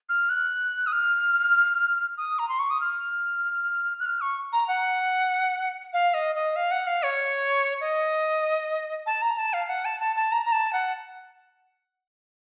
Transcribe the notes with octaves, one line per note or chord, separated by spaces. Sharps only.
F6
F#6
D#6
F6
D#6
A#5
C6
C#6
D#6
F6
F#6
F6
C#6
A#5
F#5
F5
D#5
D#5
F5
F#5
F5
C#5
D#5
A5
A#5
A5
F5
F#5
A5
A5
A5
A#5
A#5
A5
F#5